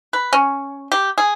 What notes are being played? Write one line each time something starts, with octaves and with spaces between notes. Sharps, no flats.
B4
C#4
G4
G#4